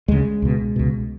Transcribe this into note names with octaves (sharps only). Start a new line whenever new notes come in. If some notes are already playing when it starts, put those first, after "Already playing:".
D2 C#3 G#3
C#2 B2
C#2 B2